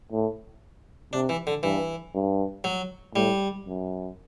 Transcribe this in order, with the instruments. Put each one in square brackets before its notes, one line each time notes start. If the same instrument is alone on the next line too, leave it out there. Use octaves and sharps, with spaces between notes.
[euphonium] A2
[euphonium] C3 [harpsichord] D4
[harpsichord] E3
D3
[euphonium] G2 [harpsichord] E3
[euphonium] G2
[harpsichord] F#3
[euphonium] A2 [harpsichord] G3
[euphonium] F#2